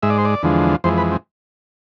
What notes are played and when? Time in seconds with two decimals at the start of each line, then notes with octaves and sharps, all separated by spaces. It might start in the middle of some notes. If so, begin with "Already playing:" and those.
0.03 G#2 G#3 E5
0.10 D5
0.18 C5
0.25 D5
0.43 E2 D3 F3 G#3
0.84 F2 E3 G#3 C5
0.98 B4
1.12 C4